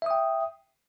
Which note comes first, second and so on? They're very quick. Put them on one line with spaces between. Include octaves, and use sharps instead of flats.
E5 D#6 G5